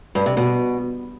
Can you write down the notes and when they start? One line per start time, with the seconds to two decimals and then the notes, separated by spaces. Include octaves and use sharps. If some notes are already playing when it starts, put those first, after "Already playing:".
0.15 G2
0.26 C3
0.37 B2